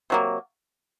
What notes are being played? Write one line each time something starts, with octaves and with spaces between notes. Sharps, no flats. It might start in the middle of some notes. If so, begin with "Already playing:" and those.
C3 F#3 A#3